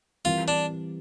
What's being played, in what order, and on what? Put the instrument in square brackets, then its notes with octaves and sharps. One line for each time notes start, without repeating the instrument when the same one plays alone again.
[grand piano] E3 G3 C4 G4 A#4 [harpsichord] F4
[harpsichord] D4